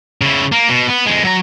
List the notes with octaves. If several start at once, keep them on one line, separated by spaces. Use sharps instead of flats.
C#3 E4
A#3
B2
B3
F2 G#3
F#3 A#5